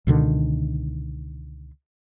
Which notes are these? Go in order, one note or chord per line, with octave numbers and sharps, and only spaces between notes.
C#2 B2 D3 D#3